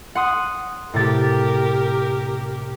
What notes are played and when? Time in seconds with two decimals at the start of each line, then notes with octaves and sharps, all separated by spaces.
0.15 F#5 C6 D#6
0.94 A2 C3 G4 A#4 A6